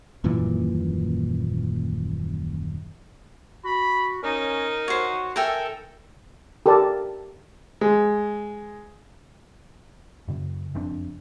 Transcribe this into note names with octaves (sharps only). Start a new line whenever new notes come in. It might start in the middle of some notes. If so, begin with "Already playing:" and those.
D#1 F#2 A#2 E3
F#4 B5
C#4 D#4 A#4
F#4 C5 C#5
A4 A#4 E5 G5 G#5
G4 A4 A#4 D5 A5
G#3
F#2 C#3
F#1 F2 C4 D4